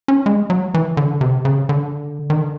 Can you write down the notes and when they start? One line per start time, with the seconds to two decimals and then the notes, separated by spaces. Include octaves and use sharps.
0.08 C#4
0.26 G#3
0.50 F#3
0.74 E3
0.97 D3
1.21 C3
1.45 C#3
1.69 D3
2.30 D#3
2.41 D3